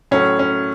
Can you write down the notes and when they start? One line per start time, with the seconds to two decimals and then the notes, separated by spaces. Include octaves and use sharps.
0.11 A2 F#3 A3 C#4
0.39 C#4